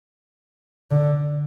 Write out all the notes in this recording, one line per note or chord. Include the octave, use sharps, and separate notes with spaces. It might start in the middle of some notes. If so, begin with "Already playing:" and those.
D3